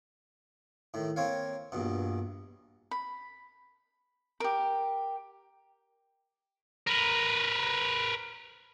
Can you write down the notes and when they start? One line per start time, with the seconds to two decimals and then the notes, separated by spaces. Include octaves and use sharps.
0.94 A2 D#3
1.16 A#3 C4 C#5 F5
1.72 A#1 G2 B2
2.91 B5
4.40 G4 A#4
6.87 A#4 B4